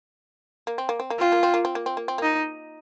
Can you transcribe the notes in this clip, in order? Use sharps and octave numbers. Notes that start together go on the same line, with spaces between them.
A#3
C4
A#3
C4
A#3
C4 F4
A#3
C4
A#3
C4
A#3
C4
A#3
C4
A#3 D#4